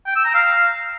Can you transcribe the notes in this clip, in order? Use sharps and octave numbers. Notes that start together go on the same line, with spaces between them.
G5
E6
A#5
F5